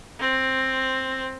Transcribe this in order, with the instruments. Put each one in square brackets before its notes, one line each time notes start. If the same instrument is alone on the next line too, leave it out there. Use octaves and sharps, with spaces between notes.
[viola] C4